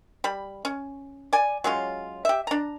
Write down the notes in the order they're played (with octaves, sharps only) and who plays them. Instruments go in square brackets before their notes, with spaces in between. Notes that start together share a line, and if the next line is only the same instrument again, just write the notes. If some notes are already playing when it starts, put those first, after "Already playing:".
[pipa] G3 B5
C#4
D5 G#5
F#3 G#3 C#4 F4
G4 E5
D4 A#5